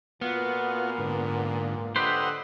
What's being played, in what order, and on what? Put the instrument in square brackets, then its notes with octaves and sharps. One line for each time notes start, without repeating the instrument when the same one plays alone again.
[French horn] A#2 [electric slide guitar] B3 [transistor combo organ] F4 F#4 F5
[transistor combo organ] G#2 D3
[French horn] D3 [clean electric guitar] G4 B4 C5 [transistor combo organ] D#5 F#5 E6